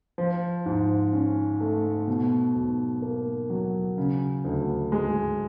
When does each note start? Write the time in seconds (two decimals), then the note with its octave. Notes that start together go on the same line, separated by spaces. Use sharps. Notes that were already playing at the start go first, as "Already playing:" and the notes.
0.18 F3
0.66 G#2
1.13 C#4
1.60 A3
2.08 B2
2.55 B1
3.02 A#3
3.50 F#3
3.98 C#3
4.45 D2
4.92 G#3